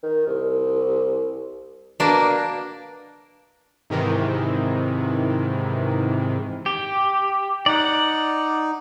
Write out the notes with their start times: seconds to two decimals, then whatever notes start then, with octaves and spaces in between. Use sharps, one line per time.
0.03 D#3
0.27 C2
2.00 B2 A#3 D4
3.90 G#2 C3 D#3 E3
6.66 G4
7.66 D#4 D5 F#5